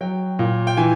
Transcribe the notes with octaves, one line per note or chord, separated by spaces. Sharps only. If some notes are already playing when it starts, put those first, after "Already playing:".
F#3 G5
A#2
G5
E3 G#5